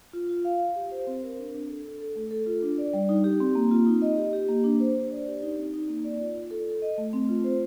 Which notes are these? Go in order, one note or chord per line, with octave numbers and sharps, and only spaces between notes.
F4
F4
F5
F5
G4
C5
C4
A#4
D4
D4
A4
A4
A4
A3
A4
F4
D4
D5
G3
D#4
G4
C4
A#3
F4
D#4
D#5
G4
G4
A#3
D4
C5
D4
D5
G4
D#4
C4
D#4
A#3
D5
F4
F4
A4
A4
D#5
A3
C4
F4
C5